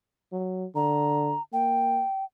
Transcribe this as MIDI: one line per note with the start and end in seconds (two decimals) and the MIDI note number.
0.32 0.66 54
0.75 1.34 50
0.75 1.42 82
1.53 2.03 58
1.53 2.25 79